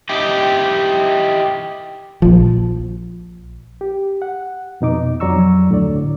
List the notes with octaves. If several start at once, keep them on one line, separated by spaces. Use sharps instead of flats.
D#4 E4 G4
A#1 F3
G4
F#5
F2 B2 D#4 D6
F2 F#3 D5 A#5 C#6 E6
D2 A2 D3 D5